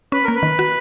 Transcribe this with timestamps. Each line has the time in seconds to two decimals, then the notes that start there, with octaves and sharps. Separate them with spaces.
0.12 C#4 B4
0.24 A#3 A#4
0.35 B4
0.43 D#3
0.59 F#4